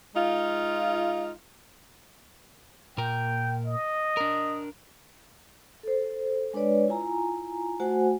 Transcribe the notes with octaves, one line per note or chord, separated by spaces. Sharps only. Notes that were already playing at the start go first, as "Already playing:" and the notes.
G#3 D#4 F4
A#2 A#4 G5
D#5
D4 A#4
A4 C5
G#3 D4 B4 C#5 D5
E4 F4 G#5 A#5
A3 F#4 C5 F#5 G#5